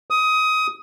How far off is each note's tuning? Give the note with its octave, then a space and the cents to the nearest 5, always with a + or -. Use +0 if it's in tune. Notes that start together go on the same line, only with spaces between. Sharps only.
D#6 +20